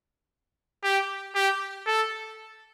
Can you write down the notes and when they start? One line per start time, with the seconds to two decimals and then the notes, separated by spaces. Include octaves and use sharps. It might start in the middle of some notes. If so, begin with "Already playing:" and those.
0.84 G4
1.35 G4
1.87 A4